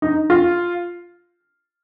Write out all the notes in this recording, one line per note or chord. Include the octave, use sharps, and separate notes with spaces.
D#4
F4